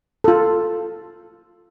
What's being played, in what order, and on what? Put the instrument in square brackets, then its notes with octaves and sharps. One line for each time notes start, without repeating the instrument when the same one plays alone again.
[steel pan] F4 A4